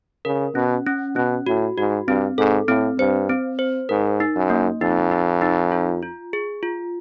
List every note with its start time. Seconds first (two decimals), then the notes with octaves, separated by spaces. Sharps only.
0.25 C#3 A#4
0.55 B2 C#4
0.86 C#4
1.16 B2 C#4
1.47 A2 F#4
1.77 G#2 F#4
2.07 G2 C4
2.38 G#2 A4
2.68 A2 C4
2.98 G2 C5
3.29 C4
3.59 C5
3.89 G#2 A#4
4.20 D#4
4.36 F#2
4.50 A#3
4.81 F2 D#4
5.12 D#4
5.42 D#4
5.72 F4
6.03 F4
6.33 G#4
6.63 F4